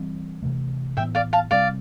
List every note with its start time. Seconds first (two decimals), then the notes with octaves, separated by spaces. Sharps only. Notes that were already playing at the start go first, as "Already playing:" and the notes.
Already playing: E3 G3 C4
0.42 C3 E3 A3
0.97 A2 E3 B3 E5 G5
1.15 D5 F5
1.33 F5 A5
1.51 C3 G3 C4 D5 F5